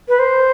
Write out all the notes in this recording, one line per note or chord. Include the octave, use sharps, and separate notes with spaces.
B4
C5